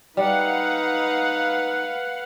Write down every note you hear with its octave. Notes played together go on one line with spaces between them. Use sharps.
G3 D#4 B4 F5 F#5